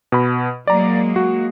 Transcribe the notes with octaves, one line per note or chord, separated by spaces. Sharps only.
B2 B5
F#3 G#3 A#3 D5 A#5
F#4